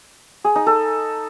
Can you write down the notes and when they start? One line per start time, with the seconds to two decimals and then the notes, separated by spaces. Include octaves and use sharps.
0.44 G#4
0.55 D#4
0.66 A4